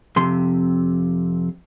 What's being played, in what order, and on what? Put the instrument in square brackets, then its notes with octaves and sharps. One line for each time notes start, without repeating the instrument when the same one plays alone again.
[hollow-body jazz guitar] F2 C3 C6